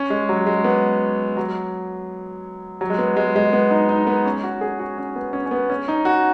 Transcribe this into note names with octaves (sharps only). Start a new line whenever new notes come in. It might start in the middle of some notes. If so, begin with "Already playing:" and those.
Already playing: C#4
G#3
F#3
G#3
B3
F#3
F#3
G#3
B3
G#3
G#3
B3
D#4
D#4
B3
C#4
F#4
G#4
F#4
C#4
B3
C#4
C#4
B3
C#4
D#4
F#4